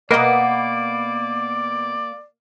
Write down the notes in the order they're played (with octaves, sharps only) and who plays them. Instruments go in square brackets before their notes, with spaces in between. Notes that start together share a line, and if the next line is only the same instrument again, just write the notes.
[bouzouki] B2 B3 [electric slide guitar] A#3 [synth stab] A#4 B4 D#5 [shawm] D5